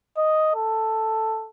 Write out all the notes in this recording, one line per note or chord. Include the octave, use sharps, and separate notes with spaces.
D#5
A4